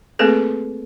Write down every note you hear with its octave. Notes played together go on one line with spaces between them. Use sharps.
A3 A#3 C4 G#4 A4 B4